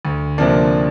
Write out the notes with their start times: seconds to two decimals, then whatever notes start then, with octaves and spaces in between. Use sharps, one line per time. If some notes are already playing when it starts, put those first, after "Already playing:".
0.05 D2
0.38 C3 F3 A#3 D4